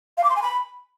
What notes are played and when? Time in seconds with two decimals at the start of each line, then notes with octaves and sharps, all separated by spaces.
0.18 F5
0.24 D6
0.30 C6
0.36 G#5
0.42 B5